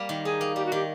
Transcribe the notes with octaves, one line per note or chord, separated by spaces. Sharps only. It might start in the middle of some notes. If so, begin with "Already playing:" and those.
Already playing: G3 A#3
D#3
D#4 G#4
A#3
G3 G4
F#4
D#3 G4